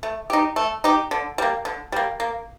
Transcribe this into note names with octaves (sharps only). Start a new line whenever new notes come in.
A3
D#4 G4
A3
D#4 G4
D3
G3 A#3
D3
G3 A#3
A#3